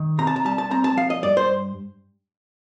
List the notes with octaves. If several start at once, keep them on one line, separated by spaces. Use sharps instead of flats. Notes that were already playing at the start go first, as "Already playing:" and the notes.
Already playing: D#3
C3 A#5
A5
A#5
G3 A5
A5
C4 A#5
A5
F3 F5
D#5
G2 D5
C5